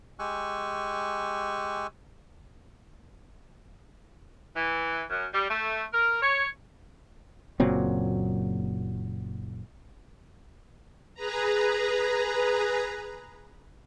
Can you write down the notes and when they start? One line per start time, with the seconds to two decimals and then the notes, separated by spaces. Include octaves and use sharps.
0.19 G#3 G4 G#5 C#6 E6 F#6
4.56 E3
5.09 F#2
5.33 G3
5.49 A3
5.92 A#4
6.22 C#5
7.60 F#1 A#2 F#3 C4
11.14 G#4 B4 A#5